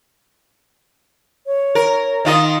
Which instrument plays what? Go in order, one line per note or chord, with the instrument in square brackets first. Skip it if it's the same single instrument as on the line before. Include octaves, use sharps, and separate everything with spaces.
[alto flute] C#5
[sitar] A#4
D#3 F4 D#5